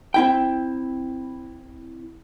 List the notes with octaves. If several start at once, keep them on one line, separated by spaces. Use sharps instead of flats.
C4 E4 G5